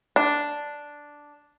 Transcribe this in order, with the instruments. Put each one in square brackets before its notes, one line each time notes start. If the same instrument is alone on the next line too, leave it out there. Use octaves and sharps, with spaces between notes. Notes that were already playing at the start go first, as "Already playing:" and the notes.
[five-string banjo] D4